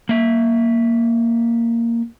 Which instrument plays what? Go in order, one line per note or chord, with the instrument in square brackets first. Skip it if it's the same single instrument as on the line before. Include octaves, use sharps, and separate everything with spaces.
[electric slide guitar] A#3 E5